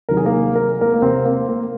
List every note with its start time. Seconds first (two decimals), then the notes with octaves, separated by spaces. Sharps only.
0.09 C3 D#3 F#3 A#4
0.17 G#4
0.25 A#3 A#4
0.56 A#4
0.81 A#3 A#4
0.94 A#3
1.02 C3 C4
1.25 A#3
1.48 A#3